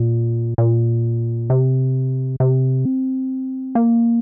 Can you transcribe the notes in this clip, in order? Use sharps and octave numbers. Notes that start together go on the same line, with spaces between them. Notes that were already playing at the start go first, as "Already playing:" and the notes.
Already playing: A#2
A#2
C3
C3
C4
A#3